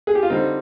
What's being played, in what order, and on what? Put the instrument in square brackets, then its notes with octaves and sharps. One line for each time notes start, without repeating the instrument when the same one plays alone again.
[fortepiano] G#4
G4
F4
D3 G3 C4 D#4